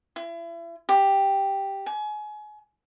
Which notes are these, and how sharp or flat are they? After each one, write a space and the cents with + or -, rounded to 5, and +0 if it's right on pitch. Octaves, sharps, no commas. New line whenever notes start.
E4 +35
G4 +0
G#5 +30